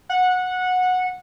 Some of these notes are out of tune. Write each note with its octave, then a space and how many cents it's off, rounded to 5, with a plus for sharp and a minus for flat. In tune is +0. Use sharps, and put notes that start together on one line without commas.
F#5 -15